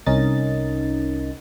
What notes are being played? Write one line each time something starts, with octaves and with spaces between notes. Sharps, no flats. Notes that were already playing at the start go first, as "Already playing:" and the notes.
C2 C#4 D#4 A#4 D#5 A6